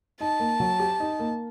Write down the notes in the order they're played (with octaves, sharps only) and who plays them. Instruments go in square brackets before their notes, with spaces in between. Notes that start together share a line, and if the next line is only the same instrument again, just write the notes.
[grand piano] D#4 [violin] A5
[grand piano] A#3
F#3
G4
D#4
A#3